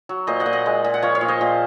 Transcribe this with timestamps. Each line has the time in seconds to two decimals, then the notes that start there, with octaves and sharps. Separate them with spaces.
0.09 F#3
0.27 A#2 C5 D#5
0.40 D#5 F#5
0.46 A#2
0.53 D#5 F#5
0.66 G#3
0.84 A#2
0.94 F#5
1.02 F3 C#5 F5
1.15 C#5 F5
1.21 A#2
1.28 C5 D#5
1.41 A#2